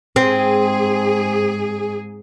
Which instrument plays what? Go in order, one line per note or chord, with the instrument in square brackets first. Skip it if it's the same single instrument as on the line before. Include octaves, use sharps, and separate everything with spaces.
[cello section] G#2 G#4 [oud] C4